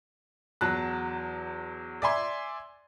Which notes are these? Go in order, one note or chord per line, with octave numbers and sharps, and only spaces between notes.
E2 F#3 A5 F#6
D5 E5 G#5 C6